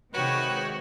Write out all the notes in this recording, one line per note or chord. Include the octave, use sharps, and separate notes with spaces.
C3 D#3 G#3 F#4 B4 C#5 G5